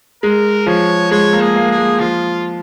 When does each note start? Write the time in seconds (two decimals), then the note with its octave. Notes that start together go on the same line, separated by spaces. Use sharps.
0.23 G#3 A#4
0.67 F3 C#5
1.11 G#3 C#5
1.33 A#3
1.41 G#4
1.56 A#3
1.71 G#4
1.78 G#3
1.99 F3 F4